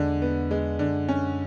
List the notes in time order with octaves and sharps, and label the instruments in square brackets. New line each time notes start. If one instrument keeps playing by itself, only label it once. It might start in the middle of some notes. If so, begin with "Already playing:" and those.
Already playing: [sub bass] E2 [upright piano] D3 G#3
[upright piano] B3
G#3
[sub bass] F#2 [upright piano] D3
[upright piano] C#4